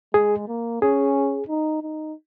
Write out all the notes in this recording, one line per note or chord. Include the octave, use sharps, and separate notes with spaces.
G#3 G#4
A#3
C#4 G#4
D#4
D#4